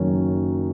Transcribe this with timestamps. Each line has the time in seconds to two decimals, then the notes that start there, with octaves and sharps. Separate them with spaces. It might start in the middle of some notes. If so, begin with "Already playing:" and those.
Already playing: F#1 F#2 D#3 F#3 C#4